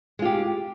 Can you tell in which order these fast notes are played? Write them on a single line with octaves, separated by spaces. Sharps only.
G#3 F4 G4